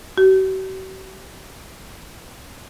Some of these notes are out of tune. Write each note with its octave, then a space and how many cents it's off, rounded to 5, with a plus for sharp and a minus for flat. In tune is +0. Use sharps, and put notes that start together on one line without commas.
F#4 +45